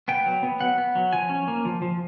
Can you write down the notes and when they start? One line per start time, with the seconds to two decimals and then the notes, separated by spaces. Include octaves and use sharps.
0.08 B3 G5
0.26 F#3
0.43 B3
0.60 F#3 F#5
0.78 B3
0.95 F#3
1.13 F3 G#5
1.29 C#4
1.48 A#3
1.65 F3
1.82 F3